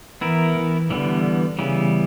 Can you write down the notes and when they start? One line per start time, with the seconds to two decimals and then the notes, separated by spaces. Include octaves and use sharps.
0.21 E3 B3 E4 A#4
0.56 E3
0.90 D3 E3 G3 B3
1.59 C#3 E3 G3 B3